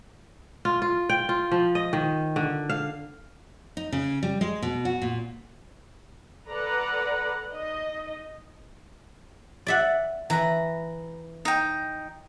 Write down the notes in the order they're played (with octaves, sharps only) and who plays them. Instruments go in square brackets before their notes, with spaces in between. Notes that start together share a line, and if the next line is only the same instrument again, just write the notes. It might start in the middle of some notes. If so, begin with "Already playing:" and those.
[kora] F4
F4
G5
F4
F3
D#5
D#3
D3
F5
[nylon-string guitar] D#4
C#3
G3
G#3
B2
F#4
A#2
[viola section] A4 B4 D5 F#5 A#5
D#4 D#5
[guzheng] D5 E5 F#5
[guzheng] E3 [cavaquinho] A#5 B5
[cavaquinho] D#4 G5